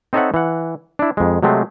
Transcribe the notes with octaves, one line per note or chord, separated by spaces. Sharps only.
C4 D#4 A4 C#5 E5 F#5
E3 F#5
D4 E4
F2 G#3
C3 F#3 G#3 A3 C4